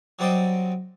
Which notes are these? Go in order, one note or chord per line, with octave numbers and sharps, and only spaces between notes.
F#3 G3 C4 C5 D5 D#5